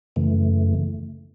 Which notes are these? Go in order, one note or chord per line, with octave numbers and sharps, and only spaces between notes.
F#2 C#3 E3 A3